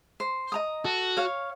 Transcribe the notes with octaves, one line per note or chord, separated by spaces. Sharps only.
C5
D#5 A#5 D#6
F#4 A4
C#5 F5